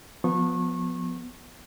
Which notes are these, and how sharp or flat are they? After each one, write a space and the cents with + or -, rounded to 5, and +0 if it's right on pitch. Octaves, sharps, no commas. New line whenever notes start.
F3 +25 B3 +0 C#6 -25